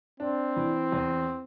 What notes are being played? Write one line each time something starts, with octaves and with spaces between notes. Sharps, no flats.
C4 D4
E3
E2